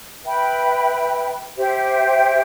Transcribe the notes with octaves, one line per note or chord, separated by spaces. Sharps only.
B4 E5 G5 B5
G4 C5 E5 G5